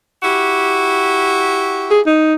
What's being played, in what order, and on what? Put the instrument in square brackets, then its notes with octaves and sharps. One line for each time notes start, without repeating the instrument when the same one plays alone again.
[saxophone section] E4 F#4 G4
[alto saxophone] G#4
D#4